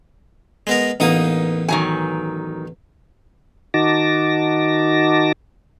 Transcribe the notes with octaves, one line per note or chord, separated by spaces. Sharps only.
G#3 B3 A#4
A1 A#3 B3 D#4 D#6
D#3 F#3 G#5
D#3 D#4 F#4 A5 D6 A#6